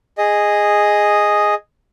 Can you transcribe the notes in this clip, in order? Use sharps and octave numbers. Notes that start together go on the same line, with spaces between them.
G#4 D#5